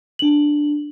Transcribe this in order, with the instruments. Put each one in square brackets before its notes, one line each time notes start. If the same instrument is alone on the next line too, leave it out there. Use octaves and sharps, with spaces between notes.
[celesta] D4 F#7